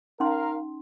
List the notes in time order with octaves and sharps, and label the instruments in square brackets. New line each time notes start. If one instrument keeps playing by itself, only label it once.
[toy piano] C#4 D#4 C6 [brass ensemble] A#4 F5